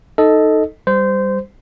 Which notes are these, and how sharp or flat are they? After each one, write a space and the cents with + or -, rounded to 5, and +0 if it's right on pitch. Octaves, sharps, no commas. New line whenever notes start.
D#4 +0 A4 +0 D#5 +10
G3 +0 C5 -20